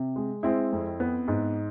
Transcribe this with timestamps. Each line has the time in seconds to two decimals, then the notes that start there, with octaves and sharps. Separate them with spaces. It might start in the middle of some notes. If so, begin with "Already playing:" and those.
Already playing: C3
0.16 G#3
0.43 G#3 C4 E4
0.72 F2
1.00 B3
1.28 G#2